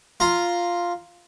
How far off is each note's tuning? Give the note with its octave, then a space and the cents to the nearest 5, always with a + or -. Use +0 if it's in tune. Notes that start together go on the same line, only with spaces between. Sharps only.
F4 +0 A#5 +0